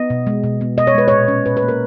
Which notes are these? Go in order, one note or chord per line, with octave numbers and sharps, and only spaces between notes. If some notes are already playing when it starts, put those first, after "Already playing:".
Already playing: B3 D#5
B2
G#3
B2
B3
B2 D#5
C#5
G#3 B4
A#2 C#5
C#4
A#2 B4
B4
A#3
A#4